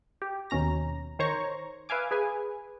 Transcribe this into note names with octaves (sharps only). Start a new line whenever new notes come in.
G4
D#2 B2 C#4 A#5 A#6
D#3 C5 C#5 A#5 C#6
B4 E5 F5 G#5 D6
G#4 B4 G#5